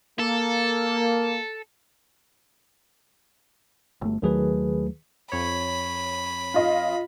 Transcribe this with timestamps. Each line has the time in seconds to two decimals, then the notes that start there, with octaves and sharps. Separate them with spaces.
0.19 A#3 A4
4.02 G1 A3
4.22 D#2 D#3 F#3 A3 G#4 B4
5.32 F2 C#5 B5
6.54 F4 D#5 F5